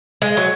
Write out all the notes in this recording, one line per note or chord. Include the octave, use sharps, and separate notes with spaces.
G#3
F#3